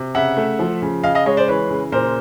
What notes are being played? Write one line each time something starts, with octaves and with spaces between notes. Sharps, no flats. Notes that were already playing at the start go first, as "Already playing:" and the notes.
Already playing: C3
C#3 E5 F#5
A3
F3
C#3
C#3 D#5 F5
D#5 F5
G#3 C#5 D#5
C5 D5
E3 B4 C#5
C#3
A#2 A#4 C5